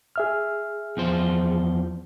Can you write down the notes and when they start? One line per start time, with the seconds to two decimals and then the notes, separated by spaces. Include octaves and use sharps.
0.16 G#4 E5 F6
0.97 E2 F3 C5